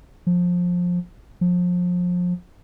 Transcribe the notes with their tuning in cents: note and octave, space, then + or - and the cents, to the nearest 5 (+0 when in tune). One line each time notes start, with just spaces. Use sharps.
F3 +20
F3 +30